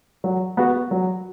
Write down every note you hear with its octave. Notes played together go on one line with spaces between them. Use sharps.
F#3
B3 F#4
F#3